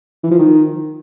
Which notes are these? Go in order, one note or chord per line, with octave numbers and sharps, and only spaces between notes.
E3
F3
D#3